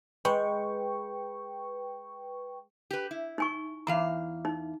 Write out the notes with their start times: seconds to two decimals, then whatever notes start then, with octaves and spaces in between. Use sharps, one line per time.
0.25 G#3 B4 G5 C#6
2.91 G4 B4
3.11 E4
3.38 D#4 G#5 C#6
3.87 E2 E3 F5 A#5
4.45 D#4